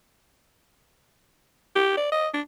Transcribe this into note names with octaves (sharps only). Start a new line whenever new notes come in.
G4
D5
D#5
D4